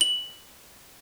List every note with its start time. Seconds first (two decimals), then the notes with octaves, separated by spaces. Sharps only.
0.01 F#7